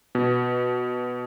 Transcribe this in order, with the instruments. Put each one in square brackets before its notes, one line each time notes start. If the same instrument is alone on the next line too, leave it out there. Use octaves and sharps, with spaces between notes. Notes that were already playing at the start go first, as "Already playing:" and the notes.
[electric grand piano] B2